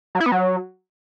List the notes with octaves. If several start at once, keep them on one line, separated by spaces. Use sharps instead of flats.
F#3
E4
B3
F#3